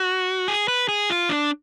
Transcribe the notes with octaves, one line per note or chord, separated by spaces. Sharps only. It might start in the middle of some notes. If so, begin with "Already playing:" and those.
Already playing: F#4
G#4
B4
G#4
F4
D4